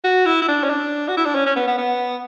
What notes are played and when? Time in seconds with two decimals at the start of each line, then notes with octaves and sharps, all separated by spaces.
0.04 F#4
0.26 E4
0.42 E4
0.48 D4
0.64 C#4
0.70 D4
1.08 F#4
1.17 E4
1.26 D4
1.35 C#4
1.46 C#4
1.56 B3
1.67 B3
1.78 B3